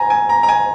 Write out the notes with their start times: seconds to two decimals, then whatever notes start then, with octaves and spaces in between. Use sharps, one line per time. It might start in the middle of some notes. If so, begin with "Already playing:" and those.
Already playing: G#5 A#5
0.10 G#5
0.29 A#5
0.43 A#5
0.49 G#5